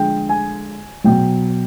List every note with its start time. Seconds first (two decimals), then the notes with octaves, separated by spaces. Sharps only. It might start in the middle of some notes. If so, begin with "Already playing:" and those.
Already playing: D3 F3 G#3 G5
0.29 G#5
1.04 B2 F#3 G5